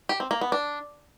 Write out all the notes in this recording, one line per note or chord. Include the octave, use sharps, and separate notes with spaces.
G4
C4
A#3
B3
D4